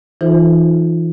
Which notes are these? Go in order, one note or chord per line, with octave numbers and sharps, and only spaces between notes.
E3 D#4 F4 A4 C5